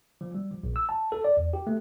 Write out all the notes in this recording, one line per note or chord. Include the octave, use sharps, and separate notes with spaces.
F3
G3
F3
A#1
E6
A5
A4
D5
E2
G4
A3